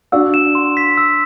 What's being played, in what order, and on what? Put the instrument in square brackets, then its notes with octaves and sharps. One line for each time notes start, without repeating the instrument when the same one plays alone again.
[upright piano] D4 F#4 [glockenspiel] E6
[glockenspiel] E7
C6
B6
E6